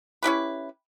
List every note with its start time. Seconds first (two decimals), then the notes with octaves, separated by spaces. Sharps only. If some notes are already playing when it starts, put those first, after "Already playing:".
0.23 C#4 E4 G4 B4